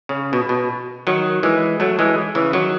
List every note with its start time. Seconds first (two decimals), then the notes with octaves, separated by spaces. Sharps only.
0.09 C#3
0.33 B2
0.49 B2
1.07 D#3 F#3
1.43 E3 G#3
1.80 F#3 A3
1.99 E3 G#3
2.35 C#3 E3
2.53 D#3 F#3